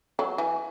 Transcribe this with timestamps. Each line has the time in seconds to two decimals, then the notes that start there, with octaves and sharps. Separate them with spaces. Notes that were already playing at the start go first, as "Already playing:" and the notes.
0.19 F#3
0.38 E3